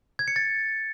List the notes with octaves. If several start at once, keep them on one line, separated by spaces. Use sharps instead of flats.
G#6
C#7
A6